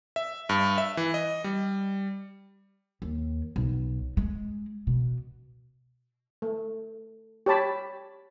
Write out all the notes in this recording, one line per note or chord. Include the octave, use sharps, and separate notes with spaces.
E5
G2
E5
E3
D#5
G3
D#2
B1
G#3
B2
A3
G4 C#5 A5 B5